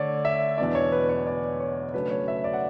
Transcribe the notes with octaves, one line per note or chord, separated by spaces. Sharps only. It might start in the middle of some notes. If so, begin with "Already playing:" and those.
Already playing: D3 A3 C#5 D5
E5
E2 B2 G#3 B3 D4 D5
C#5
B4
C#5
D5
C#5
C#3 F#3 A3 D4 B4
C#5
E5
D5
F#5